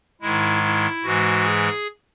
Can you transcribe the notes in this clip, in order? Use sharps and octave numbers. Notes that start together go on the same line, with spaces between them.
G#2 D#3 G#3 E4
E4
G#2 E3 G#3 F#4
G#4